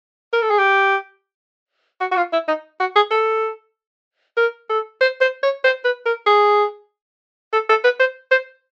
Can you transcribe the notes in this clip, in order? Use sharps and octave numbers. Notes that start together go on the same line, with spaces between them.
A#4
A4
G#4
G4
F#4
F#4
F4
E4
D#4
F#4
G#4
A4
A#4
A4
C5
C5
C#5
C5
B4
A#4
G#4
A4
A4
B4
C5
C5